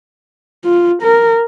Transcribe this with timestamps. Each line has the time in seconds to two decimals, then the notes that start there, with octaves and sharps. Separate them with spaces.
0.64 F4
1.02 A#4